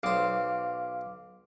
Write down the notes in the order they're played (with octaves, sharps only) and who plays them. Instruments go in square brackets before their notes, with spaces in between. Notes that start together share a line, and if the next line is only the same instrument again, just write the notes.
[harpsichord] B1 C5 [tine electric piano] F5 D6